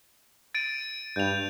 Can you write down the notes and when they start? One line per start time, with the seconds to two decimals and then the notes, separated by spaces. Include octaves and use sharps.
0.54 A6 D7 D#7
1.16 G2 G6 F7